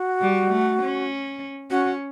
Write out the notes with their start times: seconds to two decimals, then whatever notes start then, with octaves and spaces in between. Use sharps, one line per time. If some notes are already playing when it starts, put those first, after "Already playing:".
Already playing: F#4
0.21 G3
0.51 A3
0.82 C#4
1.70 C#4 F#4